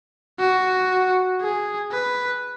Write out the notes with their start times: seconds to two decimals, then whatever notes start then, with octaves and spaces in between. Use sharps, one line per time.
0.39 F#4
1.41 G#4
1.92 B4